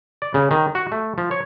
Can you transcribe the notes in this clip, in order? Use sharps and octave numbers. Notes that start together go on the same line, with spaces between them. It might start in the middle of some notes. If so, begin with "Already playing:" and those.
D5
C#3
D#3
F#4
A3
F3
C#5